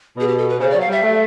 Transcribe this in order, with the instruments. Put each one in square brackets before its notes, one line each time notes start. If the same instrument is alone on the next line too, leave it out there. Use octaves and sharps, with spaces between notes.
[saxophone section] B2 [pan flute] G#4
[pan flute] G4
A4
B4
[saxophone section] C#3 [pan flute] C5
[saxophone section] F#3 [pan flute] D5
[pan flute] F5
[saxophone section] G3 [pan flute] E5
[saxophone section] A3